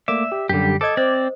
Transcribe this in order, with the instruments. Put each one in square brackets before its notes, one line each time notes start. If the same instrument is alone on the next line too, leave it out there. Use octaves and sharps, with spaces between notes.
[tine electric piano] A3 A#3 D6 [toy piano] D5 [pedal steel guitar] E5
[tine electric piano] G4
[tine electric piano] F#2 D3 [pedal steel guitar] G3 G4
[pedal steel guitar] A4 [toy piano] C#5 D#5 D#6 [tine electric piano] D6 G#6
[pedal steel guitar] C4 D5 [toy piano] C5